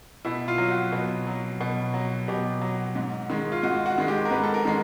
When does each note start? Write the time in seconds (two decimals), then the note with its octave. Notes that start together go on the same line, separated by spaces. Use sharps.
0.25 B2 E4
0.48 F4
0.58 F#3
0.70 F#4
0.92 B2
1.27 F#3
1.61 B2
1.94 F#3
2.28 B2 G4
2.61 F#3
2.95 G#2
3.30 D#3 G#3
3.52 F4
3.63 G#2 F#4
3.86 F#4
3.98 D#3 G#3
4.08 G4
4.25 A#4
4.31 G#2 B4
4.44 A4
4.54 A#4
4.65 D#3 G#3